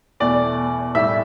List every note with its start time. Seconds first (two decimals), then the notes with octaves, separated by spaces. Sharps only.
0.20 E2 B2 A3 D5
0.95 A2 G3 E5